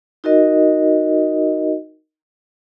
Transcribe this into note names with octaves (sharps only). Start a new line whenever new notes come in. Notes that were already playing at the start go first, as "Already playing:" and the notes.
D#4 F#4 A#4 D#5